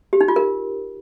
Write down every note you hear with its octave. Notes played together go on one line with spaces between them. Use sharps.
G4
D#4
F4
A#4